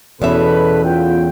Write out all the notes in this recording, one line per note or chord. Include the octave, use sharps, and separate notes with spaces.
E2 B2 C#4 A4 B4 E5
B3 F4 G5